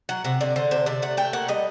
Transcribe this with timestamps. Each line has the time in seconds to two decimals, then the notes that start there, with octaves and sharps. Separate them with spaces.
0.09 F#3 F#5
0.25 C3 F#5
0.41 D3 D5
0.56 D3 C5
0.71 C3 C5
0.86 C3 D5
1.02 A3 F#5
1.17 A3 G5
1.33 A#3 F#5
1.48 G3 D#5